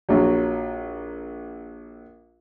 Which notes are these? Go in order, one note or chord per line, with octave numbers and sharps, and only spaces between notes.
A#1 F#3